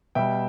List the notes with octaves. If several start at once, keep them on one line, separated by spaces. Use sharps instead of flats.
B2 G3 E5 G5